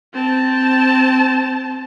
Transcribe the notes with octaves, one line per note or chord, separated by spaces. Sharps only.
C4 A5